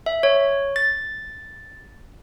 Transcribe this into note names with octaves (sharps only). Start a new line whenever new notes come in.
E5
C#5
A6